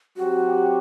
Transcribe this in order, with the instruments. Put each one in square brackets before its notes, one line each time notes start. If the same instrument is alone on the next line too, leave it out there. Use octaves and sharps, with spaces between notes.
[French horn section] F#3 C4 G4 [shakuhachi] F#4